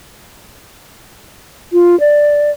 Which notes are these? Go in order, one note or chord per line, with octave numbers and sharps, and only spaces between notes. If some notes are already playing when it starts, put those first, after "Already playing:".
F4
D5